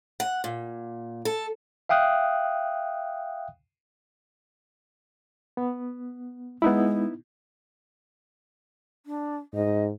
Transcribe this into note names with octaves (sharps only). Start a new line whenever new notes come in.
F#5
A#2
A4
E5 F5 G5 D#6 F#6
B3
G#3 B3 D#4 E4
D4
G#2 D#5